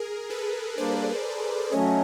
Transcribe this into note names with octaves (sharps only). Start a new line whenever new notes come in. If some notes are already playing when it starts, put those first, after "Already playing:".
Already playing: G#4 A#4
A4 B4
G3 A#3 D4 C5 D5
F#3 A3 C#4 C#5 D#5